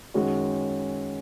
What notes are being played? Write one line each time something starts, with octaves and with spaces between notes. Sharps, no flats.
F#2 D#3 G#3 C#4 F#4